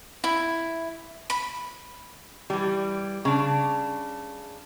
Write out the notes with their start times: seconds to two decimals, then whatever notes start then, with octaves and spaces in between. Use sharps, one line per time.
0.24 E4
1.30 B5
2.50 E3 G3
3.25 C#3 D4